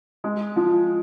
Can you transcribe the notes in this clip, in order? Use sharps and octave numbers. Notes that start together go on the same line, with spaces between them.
G#3
F3